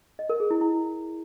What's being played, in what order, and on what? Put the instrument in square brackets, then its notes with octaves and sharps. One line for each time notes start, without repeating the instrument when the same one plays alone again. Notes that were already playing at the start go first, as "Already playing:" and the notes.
[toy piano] D#5
A#4
G#4
E4
E4